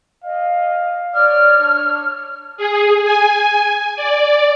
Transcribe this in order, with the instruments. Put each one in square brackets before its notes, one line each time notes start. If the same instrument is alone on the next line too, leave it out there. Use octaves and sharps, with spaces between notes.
[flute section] D#5 [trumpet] F5
[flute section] C#5 F6 [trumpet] D5
[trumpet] D4
[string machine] G#4
G#5
D5